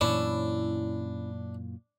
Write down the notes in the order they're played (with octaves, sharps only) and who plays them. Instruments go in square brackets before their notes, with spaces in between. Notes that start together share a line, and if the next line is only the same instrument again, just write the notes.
[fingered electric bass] F#2 A#2 E3 [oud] C#4 E4 [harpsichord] D4